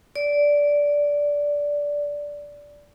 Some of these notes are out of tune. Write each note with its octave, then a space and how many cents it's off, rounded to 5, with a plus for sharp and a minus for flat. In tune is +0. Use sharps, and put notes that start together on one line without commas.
D5 -10